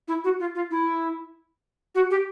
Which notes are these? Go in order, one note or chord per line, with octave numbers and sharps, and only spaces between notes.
E4
F#4
F4
F4
E4
F#4
G4